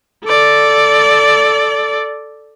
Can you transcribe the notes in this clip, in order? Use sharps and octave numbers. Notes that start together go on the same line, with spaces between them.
A4 D5